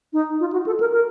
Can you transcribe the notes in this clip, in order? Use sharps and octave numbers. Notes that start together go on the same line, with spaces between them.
D#4
F4
F#4
A4
A#4
A#4